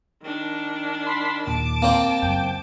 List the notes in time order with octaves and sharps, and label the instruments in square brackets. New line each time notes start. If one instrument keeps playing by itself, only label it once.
[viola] D#3 D4
[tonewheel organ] B5 C6
[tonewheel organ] D#2 A#2 [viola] A5 D6
[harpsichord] A#3 C4 C5
[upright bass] C#2 F#2 [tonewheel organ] G5